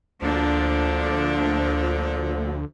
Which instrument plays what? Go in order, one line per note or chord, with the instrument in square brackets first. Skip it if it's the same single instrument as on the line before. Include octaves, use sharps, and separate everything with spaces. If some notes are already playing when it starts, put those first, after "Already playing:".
[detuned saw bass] D2 [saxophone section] A#2 D3 F3 [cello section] D4